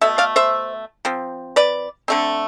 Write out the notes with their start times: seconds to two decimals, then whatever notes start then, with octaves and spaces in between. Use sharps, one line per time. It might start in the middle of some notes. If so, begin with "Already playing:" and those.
0.01 B2 A3 E5
0.18 D5 F5
0.36 C5 E5
1.05 F3 C4
1.56 B4 D5
2.08 D3 A3 C4